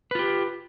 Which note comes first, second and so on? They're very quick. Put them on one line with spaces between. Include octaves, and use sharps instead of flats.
B4 F4 G4